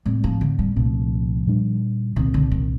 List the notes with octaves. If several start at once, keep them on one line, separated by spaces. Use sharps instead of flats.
A2 G3 A3 C4
F3
D3
G3
C2 A#2 F3 A3 C4
A#2 G3 D4
C2 A#2 D#3 F3 C4
D3
D#3